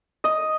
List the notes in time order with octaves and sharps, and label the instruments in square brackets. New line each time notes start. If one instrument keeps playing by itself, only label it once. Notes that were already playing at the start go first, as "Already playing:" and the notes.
[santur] D#5